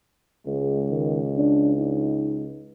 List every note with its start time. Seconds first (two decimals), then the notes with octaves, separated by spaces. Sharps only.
0.47 C#2 G#3
0.89 D#3
1.37 D4
1.77 D#4